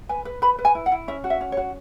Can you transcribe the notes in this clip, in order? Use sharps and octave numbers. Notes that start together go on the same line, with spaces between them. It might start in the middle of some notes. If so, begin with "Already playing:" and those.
B4 G#5
B4
B4 B5
B4
G#5
E4
F#5
E4
C#4 E5
F#4
E5
C#4
C#5
F#4